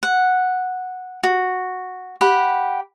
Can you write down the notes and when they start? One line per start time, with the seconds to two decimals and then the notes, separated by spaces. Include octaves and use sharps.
0.03 F#5
1.23 F#4
2.21 G4 F#5 B5